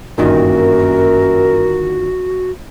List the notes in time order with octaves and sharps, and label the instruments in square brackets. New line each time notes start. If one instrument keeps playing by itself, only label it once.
[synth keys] G1 A#2 D#3 [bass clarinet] F#2 [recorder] F#4 [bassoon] A#4